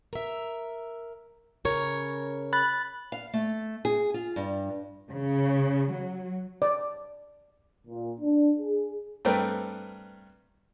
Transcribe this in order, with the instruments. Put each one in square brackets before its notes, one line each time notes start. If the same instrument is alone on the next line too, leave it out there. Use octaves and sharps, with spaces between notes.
[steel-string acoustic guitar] A#4 E5
C#3 A#4 C#5
[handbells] B5 F#6 A6
[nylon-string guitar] F5
A3
G#4
F4
G2
[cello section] C#3
F#3
[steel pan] D5
[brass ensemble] A#2
D4
G#4
[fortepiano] G2 A3 C4 A#4 B4 G5